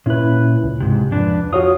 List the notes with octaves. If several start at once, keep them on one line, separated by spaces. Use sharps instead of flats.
A#2 C#4 E4 B4
C#2
G#2 C3
F2 D4 B4
F4 F#4 C#5 D#6